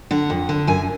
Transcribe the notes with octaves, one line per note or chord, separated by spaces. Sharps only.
D3 F#5
F2
D3
F#2 G#5